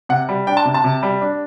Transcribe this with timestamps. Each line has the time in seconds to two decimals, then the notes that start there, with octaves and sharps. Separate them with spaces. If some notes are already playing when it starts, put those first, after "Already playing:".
0.09 C3 F#5
0.29 G3
0.47 D4 G5
0.57 A5
0.65 C3
0.74 A5
0.84 C3
1.03 G3
1.21 D4